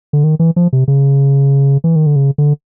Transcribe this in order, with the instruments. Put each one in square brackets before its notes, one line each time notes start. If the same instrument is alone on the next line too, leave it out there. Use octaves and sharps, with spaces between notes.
[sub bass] D3
D#3
E3
F3
C3
C#3
E3
D#3
D3
C#3
D3